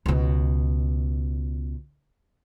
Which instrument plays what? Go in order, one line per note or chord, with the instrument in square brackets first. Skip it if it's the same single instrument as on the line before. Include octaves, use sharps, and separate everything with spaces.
[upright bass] C#2 B2